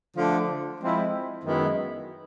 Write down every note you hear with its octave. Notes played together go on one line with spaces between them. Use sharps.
D3 F3 A3 D4
F3 G#3 C4 E4
F#2 D#3 G#3 B3 E4